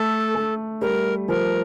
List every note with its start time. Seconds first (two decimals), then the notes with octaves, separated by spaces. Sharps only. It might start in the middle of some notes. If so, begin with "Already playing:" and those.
Already playing: A3 A4
0.35 A3
0.81 G3 A#4
1.28 F3 A#4